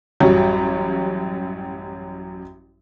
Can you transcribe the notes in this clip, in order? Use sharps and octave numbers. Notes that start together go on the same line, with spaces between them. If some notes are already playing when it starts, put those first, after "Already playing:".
A1 F#2 F#3 G3 C#5